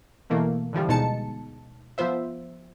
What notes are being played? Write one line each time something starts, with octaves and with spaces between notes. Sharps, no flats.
B2 E3 A3 A#3
D3 E3 F3 G3
D2 B2 G#3 D#4 A5 C#7
F3 B3 F4 C5 E5